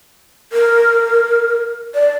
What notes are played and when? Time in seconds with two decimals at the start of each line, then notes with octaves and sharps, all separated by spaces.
0.53 A#4
1.95 D5